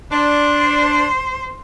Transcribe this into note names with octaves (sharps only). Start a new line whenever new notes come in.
D4 C5